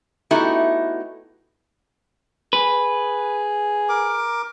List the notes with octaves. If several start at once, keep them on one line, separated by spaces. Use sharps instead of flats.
A3 B3 D#4 E4 F#4 G4
G#4 B4
A#4 D6